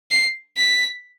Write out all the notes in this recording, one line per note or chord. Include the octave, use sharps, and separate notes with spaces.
C7
B6